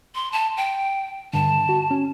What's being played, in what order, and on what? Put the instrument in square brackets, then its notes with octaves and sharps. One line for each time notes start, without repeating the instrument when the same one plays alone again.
[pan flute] C6
A5
G5
[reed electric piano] G2 D3 [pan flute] A5
[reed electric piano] F#4
C#4